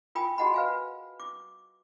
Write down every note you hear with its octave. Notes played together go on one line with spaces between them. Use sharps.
F4 A#4 G5 G#5 B5 D#6
F#4 G#4 D#5 F#5 A5 B5
B4 F5 G#5
D6